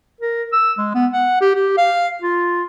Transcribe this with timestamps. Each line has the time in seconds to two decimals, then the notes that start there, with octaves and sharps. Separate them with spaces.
0.21 A#4
0.53 E6
0.78 G#3
0.94 B3
1.13 F#5
1.41 G4
1.55 G4
1.78 F5
2.22 F4